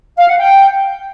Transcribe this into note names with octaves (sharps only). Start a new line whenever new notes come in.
F5
F#5
G5